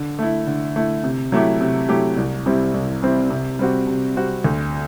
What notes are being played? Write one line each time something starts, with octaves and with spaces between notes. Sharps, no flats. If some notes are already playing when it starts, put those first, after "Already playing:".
Already playing: D3
A3 E4
D3
A3 E4
C3
F#3 A3 E4 G4
C3
F#3 A3 E4 G4
C2
C3 G3 C4 E4
C2
C3 G3 C4 E4
C3
G3 C4 F#4
C3
G3 C4 F#4
D2